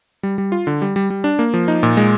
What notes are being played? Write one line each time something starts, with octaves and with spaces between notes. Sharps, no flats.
G3
G3
F4
D3
G3
G3
G3
D4
A#3
F3
D#4
A#2
G#3